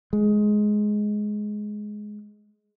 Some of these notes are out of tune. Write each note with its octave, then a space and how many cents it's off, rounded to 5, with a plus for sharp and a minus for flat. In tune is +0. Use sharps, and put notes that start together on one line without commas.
G#3 +10